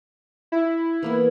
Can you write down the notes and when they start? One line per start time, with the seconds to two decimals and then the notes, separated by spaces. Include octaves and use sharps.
0.52 E4
1.03 E3 A#3 B3